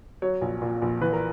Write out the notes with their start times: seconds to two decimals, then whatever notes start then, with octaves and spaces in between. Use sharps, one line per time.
0.22 F#3 C#5
0.41 A#1
0.62 A#2
0.82 A#1
1.01 E3 B4
1.13 A#4